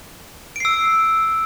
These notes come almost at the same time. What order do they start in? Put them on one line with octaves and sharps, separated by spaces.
D7 C7 E6